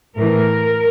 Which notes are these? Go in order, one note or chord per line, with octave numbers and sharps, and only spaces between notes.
A2 E3 A#4